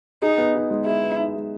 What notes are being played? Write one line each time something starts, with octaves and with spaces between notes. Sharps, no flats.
D#4 G#4
B3
D#4
G#3
E4 G#4
B3
D#4
G#3